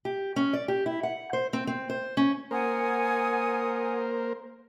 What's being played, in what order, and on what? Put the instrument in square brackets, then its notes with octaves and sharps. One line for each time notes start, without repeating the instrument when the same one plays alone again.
[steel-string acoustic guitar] G4
C#4
D5
G4
E4
F#5
C5
C4
C4
C5
C#4
[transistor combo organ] A#3 A#4 C5 [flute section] F#5 G#5 D#6